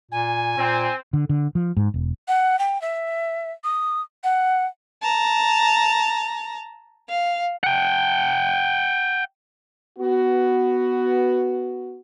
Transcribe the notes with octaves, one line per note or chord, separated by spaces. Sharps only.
A#2 G#5
A#2 C4
D3
D3
F3
G#2
E1
F#5
G5
E5
D#6
F#5
A5 A#5
F5
F#5 G5
B3 F#4